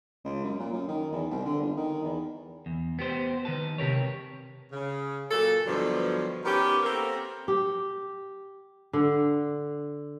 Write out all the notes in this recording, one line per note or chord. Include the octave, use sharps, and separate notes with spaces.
C#2
F#2
A#2
F#2
D#3
E2
C2
D3
G1
D#3
E2
E2
B3 G4 C5
D#3 B4 A5
C3 G4 A#4 C#5
C#3
A#2 F#3 A4
G2 B2 D3 D#3 F3 F#3
D#3 B3 C#4 G4
A#3 C4 A4 A#4
G4
D3